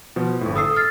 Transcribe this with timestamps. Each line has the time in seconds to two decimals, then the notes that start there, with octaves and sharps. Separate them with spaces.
0.16 B2 F3
0.41 G1 A2
0.55 A4 D#6 E6 C7
0.76 F6 A6 C7